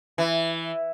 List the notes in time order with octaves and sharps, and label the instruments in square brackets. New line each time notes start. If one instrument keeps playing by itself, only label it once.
[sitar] E3